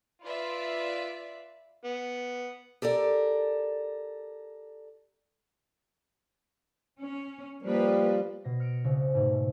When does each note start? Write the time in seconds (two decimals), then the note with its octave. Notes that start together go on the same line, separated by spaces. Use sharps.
0.22 F4 B4 D5 E5
1.84 B3
2.82 G4 A4 A#4 D5
7.00 C#4
7.62 F3 G3 A#3 B4
8.44 B2 A#6 C7
8.60 F6 C#7 D7
8.84 C2 C#3
9.15 G#2 B2 A3